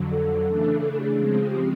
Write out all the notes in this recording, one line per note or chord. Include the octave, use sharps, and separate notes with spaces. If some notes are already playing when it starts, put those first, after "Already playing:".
Already playing: F2 D3 F#3
A4
C#3 E3 A3 D4
A4
A4
G4
G#4
C#3 F3 G#3 C4
G4